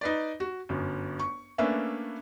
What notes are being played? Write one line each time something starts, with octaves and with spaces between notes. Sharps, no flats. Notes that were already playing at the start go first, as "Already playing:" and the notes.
D#4 B4 D5
F#4
G1 F#2
C#6
A3 A#3 C#4 D4 B4 E5